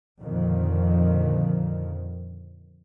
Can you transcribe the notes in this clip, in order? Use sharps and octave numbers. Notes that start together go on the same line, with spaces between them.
F2 A#2 D3 D#3